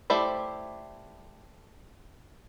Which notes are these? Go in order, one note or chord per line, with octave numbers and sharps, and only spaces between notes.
A3 E4 G4 C5 D5